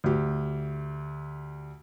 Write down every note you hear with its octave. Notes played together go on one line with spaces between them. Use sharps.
D2 G4